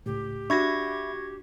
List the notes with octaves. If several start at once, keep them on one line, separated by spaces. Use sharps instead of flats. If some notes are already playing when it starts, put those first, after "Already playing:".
C#2 A2 G4
D4 F#4 E5 B5 C#6 G#6 A#6